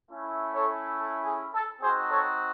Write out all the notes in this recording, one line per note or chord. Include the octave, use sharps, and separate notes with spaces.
A3 C#4 E4
A4 C#5
A4
G#4
A4
C4 D#4 F#4 G#4 C5
A4 C#5